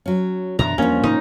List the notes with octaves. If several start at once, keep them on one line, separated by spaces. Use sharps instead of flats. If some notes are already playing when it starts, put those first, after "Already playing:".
F#3 C#4
F#2 B2 D3 E3 A#5
E2 F3 G3 A#3 C#4 D4
G#2 C3 D#4